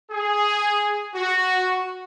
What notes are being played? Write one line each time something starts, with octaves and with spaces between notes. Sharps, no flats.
G#4
F#4